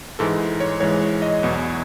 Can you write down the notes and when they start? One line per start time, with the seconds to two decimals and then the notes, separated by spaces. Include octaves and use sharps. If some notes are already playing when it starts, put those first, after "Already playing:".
0.19 G#2 E3 G#3 A4
0.60 C#5
0.80 G#2 E3 G#3 C#5
1.02 C#5
1.22 D#5
1.43 E2 B2 F#3